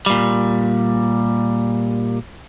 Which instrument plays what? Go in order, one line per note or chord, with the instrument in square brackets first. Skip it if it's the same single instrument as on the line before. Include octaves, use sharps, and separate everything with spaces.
[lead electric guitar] A#2 G3